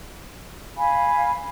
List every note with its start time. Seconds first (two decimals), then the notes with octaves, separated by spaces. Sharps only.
0.76 F5 G#5 B5